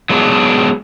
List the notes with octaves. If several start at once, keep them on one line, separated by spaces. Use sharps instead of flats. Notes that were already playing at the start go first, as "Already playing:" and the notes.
F#3 G#3 B3 D4